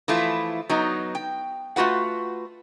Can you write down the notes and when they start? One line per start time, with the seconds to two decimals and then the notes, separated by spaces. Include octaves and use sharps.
0.08 E3 F3 A3 E4 F4
0.69 F#3 B3 D#4
1.15 G5
1.76 A3 F4 F#4 B4 F#5